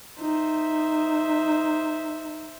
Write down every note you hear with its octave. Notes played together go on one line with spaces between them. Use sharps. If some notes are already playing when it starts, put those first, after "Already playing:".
D#4 C5 E5